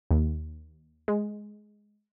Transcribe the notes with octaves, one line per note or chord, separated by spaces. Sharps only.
D#2
G#3